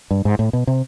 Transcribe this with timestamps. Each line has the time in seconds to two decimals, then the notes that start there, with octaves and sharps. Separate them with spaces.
0.11 G2
0.25 G#2
0.39 A2
0.53 B2
0.67 C3